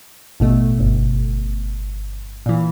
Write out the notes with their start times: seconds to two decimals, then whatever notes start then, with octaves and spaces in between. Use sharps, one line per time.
0.40 A1 B2 A3
0.79 G1
2.46 A#2 E3